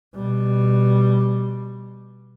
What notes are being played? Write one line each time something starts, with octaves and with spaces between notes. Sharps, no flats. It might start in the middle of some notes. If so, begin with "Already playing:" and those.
B2 G3